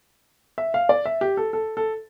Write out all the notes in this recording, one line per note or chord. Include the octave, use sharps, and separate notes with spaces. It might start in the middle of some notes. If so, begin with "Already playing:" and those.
E5
F5
D5
E5
G4
A4
A4
A4